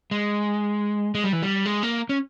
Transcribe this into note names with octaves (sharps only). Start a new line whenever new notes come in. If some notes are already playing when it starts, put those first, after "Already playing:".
G#3
G#3
G3
E3
G3
G#3
A#3
C#4